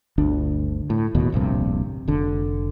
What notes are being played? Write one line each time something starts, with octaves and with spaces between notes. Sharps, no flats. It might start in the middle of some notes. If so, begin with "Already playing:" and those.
G1 D2 D4
A2
D1 D#2 B2
D1 A#1 G2 C3
F1 D3